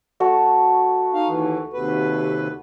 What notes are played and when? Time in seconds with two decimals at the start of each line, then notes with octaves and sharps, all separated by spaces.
0.20 A3 F#4 A5
1.14 D#4 F5
1.28 D#2 E3
1.73 D#2 C3 B4